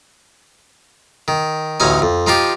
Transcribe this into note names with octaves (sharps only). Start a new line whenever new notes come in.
D#3
A1 D2 C#4 D#4 G#5
F2
F3 D#4 F4 G4